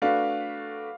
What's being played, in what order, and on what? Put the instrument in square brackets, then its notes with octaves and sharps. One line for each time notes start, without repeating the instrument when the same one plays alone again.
[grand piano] A3 D4 F#4 B4 [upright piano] F5